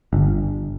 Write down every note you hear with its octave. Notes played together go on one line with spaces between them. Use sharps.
G1